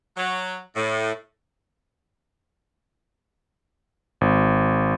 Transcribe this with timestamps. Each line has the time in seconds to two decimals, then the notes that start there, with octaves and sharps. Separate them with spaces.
0.17 F#3
0.76 A2
4.21 G#1